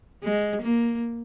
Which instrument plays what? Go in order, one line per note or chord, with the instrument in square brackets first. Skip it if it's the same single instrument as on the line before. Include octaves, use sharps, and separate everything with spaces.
[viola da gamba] G#3
A#3